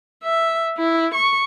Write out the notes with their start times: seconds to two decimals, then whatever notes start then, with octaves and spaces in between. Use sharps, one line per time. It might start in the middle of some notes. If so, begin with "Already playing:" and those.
0.24 E5
0.78 E4
1.14 C#6